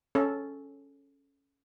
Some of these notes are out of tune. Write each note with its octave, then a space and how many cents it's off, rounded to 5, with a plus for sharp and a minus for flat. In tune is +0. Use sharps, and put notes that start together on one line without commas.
C#4 +0 A4 -5 C#5 +0